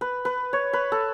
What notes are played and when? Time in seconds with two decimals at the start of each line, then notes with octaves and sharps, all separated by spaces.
0.01 B4
0.25 B4
0.53 C#5
0.73 B4
0.92 A4